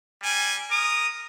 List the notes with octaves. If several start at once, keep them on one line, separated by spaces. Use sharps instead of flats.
G3 G#5
A#4 D#6